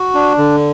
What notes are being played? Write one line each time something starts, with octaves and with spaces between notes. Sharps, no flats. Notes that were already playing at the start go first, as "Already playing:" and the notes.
Already playing: F#4
D4
D3